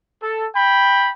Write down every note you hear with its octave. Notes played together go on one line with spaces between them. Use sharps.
A4
G5 B5